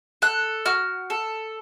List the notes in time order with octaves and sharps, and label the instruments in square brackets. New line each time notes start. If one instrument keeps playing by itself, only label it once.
[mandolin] A4 F#6
F#4 F6
A4